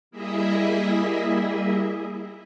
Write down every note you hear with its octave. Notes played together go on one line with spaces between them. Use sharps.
G3 A#3 E4 G#4 D#5 E5